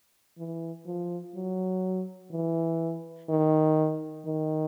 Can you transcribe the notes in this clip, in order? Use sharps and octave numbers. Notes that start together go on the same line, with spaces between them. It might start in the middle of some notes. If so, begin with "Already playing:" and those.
E3
F3
F#3
E3
D#3
D#3